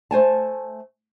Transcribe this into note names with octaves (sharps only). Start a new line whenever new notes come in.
A3 C5 G#5 A5